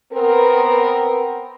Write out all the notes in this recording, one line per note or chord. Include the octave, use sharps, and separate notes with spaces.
B3 C4 A#4